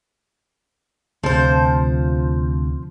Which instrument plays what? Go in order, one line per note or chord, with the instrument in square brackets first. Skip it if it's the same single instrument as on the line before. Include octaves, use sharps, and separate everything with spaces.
[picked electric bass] D2 C3 [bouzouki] F3 C5